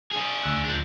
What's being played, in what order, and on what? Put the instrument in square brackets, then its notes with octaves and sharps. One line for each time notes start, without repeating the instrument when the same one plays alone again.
[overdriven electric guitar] D4 G#4
[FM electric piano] D2 E6 F#6
[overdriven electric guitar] F3 D4